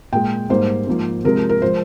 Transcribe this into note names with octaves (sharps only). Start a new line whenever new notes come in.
A#2 G#3 G5
G#2 G3 A#3 C5
G#2 F3 A#3
C3 F3 G#3 A#4
A#4
F3 G#3 C5